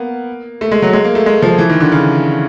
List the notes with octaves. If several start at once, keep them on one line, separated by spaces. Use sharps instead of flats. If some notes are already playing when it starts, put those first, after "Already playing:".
Already playing: A#3 B3
A3
G#3
F#3
G#3
A#3
A3
G#3
F3
E3
D#3
D3
C#3